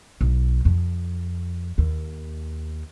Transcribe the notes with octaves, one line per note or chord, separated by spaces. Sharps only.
B1
F2
D#2